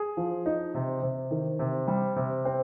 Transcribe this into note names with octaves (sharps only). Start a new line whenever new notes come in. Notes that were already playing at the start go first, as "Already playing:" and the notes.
Already playing: G#4
F3
D#4
C3
C3
D#3
C3
G3
C3
C4